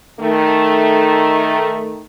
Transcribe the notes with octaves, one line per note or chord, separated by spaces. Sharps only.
D#3 A3